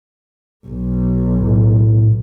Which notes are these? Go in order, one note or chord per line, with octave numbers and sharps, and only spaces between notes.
B1
A2